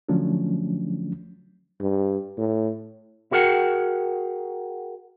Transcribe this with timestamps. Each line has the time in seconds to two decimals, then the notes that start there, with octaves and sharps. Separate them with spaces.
0.09 D3 F3 F#3 A3 C#4 D4
1.80 G2
2.38 A2
3.31 E4 F#4 G#4 A#4 F#5 G5